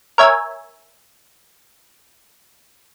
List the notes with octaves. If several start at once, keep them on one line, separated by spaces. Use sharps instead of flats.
A#4 C#5 E5 G#5